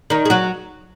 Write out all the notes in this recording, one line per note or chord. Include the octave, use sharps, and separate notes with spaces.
D#3 D#4
G#4
F#3 F#4